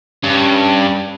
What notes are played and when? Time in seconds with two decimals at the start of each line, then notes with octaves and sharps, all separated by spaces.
0.23 G2 C#4